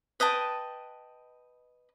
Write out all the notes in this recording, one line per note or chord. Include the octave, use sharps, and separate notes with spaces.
B4 D#5 G5 A5